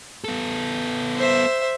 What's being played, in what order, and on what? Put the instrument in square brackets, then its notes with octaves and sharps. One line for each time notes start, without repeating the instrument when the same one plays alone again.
[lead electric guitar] B3 A4
[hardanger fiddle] C5 E5